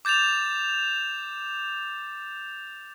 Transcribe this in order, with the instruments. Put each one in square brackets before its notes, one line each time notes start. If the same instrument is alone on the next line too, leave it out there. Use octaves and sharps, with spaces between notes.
[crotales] D6 G6 A6 E7 F7